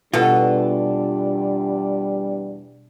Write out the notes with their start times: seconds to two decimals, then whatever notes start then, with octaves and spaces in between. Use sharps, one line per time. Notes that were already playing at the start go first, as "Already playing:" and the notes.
0.14 E2 B2 G3 D4 F4 A4